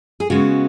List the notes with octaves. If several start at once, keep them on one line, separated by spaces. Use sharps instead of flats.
G#4
C#3 G#3 B3 F#4